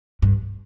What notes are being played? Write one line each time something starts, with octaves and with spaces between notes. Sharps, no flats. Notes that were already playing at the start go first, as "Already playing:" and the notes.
G2